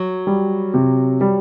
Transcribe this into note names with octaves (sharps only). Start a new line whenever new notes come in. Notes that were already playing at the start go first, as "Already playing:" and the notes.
Already playing: F#3
G3
C3
G3